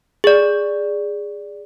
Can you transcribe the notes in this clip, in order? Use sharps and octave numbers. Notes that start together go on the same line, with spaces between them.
G#4 D5